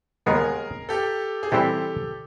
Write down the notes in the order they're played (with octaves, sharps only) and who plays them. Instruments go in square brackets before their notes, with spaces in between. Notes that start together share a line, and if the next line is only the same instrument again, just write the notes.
[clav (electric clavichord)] D#2 D#3 G#3 B3 [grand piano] G#4 A#4
[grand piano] G4 A4
G#4
[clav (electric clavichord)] E3 G3 C4 E4 [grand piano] G4 A4